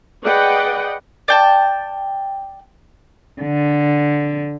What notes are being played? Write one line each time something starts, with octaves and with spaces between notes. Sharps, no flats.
G#4 B4 D5 D#5 F#5 G5
D5 G5 A5
D3